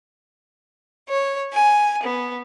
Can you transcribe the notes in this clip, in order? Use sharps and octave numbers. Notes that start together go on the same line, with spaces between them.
C#5
G#5
B3